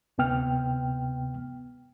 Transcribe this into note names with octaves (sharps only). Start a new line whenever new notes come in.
D2 C3 B3 G5 F6